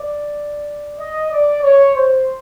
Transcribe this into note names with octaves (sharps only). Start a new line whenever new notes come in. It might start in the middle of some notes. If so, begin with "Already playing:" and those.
Already playing: D5
D#5
D5
C#5
C5